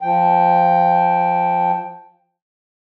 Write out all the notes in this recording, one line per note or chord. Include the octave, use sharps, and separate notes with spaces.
F3 G5